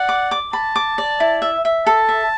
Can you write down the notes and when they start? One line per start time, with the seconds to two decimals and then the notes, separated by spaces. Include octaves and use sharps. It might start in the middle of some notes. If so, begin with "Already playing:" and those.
Already playing: D5 F#5
0.09 D6
0.31 D6
0.53 A5 B5
0.76 D6
0.98 D5
1.20 E4
1.42 E5
1.65 E5
1.86 A4 A5
2.09 E5